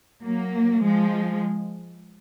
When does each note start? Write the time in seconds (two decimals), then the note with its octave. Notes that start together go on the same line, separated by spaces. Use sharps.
0.24 F#3 A#3
0.82 F3 G#3